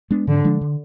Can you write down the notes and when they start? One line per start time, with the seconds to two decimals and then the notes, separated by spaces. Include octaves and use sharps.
0.11 G#3 B3 D4
0.27 G#2 D3
0.44 F3 G#3 D4
0.61 D3